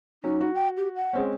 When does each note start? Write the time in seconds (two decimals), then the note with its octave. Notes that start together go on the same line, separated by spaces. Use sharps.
0.24 F#3 C#4 D#4
0.41 F#4
0.55 G5
0.77 G4
0.96 F#5
1.13 G#3 C4 C#4